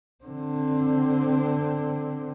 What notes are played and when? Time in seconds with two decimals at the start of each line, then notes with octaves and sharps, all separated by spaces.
0.24 D3 C4